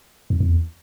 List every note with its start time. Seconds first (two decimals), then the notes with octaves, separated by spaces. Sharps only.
0.30 F2
0.40 F2
0.50 E2